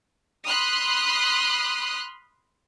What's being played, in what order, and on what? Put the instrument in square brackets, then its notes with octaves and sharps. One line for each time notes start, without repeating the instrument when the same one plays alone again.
[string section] B5 C6 D#6 F6 F#6